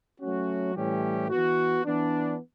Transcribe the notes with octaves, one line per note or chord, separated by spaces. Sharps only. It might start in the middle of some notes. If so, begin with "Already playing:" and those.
F#3 A3 C#4 F#4
A2 E3 G3 C#4 G4
E3 B3 F#4
E3 B3 D4